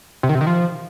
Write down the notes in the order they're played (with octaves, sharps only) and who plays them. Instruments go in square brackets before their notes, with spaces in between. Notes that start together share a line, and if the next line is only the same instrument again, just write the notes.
[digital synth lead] C3
D#3
C3
D#3
F3